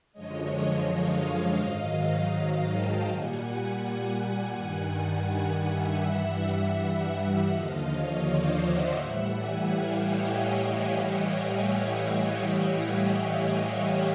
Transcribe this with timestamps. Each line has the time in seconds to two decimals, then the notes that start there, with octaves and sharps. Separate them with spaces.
0.12 F#2 D3 F3 G#3 C#5 D#5
0.86 D#5 F5
1.60 G#2 D#3 F#3
2.32 D#5 F5
2.69 G5 A5
3.06 A#2 G3 F#5 G#5
4.53 G2 D#3 G3
5.26 F#5 G#5
5.63 E5 F#5
6.00 G2 E3 G3
7.46 D#2 D3 F3 D#5 F5
7.82 C#5 D#5
8.19 C5 D5
8.55 E5 F#5
8.92 A2 E3 G3 E5 F#5
9.29 F#5 G#5
9.65 F5 G5
10.02 C#5 D#5